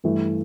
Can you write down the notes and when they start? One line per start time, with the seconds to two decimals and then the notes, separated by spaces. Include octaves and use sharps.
0.04 G2 E3 A3